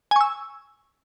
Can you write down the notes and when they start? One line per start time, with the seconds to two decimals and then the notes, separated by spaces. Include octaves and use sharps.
0.11 G#5
0.16 C#6
0.21 E6